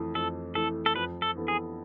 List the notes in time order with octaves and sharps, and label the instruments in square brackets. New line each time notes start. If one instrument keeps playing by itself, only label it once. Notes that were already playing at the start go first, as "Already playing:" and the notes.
Already playing: [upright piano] F2 E3 A3
[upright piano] F2 [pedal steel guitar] A4
[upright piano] E3 A3 [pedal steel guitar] A4
[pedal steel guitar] A4
[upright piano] F2 [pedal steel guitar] B4
[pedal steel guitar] A4
[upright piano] E3 B3 E4 A4
[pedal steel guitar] G#4